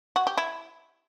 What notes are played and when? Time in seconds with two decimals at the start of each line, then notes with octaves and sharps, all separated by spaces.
0.16 F#4
0.27 G4
0.38 E4